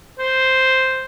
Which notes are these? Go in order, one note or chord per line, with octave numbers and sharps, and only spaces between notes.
C5